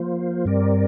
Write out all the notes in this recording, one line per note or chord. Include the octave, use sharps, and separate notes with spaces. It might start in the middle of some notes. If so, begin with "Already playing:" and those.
Already playing: F3 A#3 F4 C5
G2 G3 C4 A#4 D5